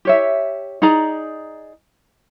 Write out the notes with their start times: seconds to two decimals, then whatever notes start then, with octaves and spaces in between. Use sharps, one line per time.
0.05 G4 C#5 E5
0.82 D#4 G#4 D5 A#5